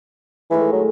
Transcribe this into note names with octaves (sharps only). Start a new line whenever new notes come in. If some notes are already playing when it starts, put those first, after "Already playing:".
A2 D#3 E3 G#3
F#3